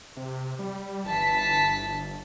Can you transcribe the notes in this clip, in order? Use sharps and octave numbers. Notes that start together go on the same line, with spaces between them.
C3
G3
G1 E3 A5 B6